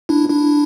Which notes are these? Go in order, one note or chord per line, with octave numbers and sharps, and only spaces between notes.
D4 E4
D4 E4